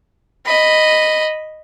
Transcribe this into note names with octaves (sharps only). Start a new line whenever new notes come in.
D#5 B5